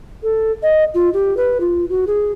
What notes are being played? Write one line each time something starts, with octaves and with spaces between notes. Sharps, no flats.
A4
D#5
F4
G4
B4
F4
F#4
G#4